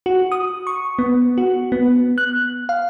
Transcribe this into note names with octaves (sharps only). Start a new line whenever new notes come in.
F#4
D#6
C#6
B3
F#4
B3
F#6
F5